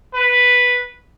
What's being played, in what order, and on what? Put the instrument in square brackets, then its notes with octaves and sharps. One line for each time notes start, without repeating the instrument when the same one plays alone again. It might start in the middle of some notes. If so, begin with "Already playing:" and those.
[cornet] B4